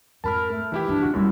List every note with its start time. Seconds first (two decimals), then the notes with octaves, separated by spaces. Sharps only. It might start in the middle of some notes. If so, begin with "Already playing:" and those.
0.24 F2 G#2 A#4 A5 B5 F6
0.51 A3
0.72 D#3 E3 E4 G4
0.88 G2 F3 D4
1.02 C#3 F4 F#4
1.14 D1 F#2 G3 E4